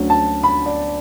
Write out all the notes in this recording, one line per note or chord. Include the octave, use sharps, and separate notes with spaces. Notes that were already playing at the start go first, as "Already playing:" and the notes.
Already playing: D2 D3 F#3 C#4
A5
B5
D5